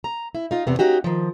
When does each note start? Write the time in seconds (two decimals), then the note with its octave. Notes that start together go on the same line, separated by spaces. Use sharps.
0.04 A#5
0.35 E4
0.51 D#4 F4
0.67 E2 C3 B3
0.79 A#3 C#4 D#4 F#4 G4
1.04 D#3 F3